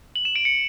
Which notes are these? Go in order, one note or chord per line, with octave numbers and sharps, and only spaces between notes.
F#7
E7
D7
C#7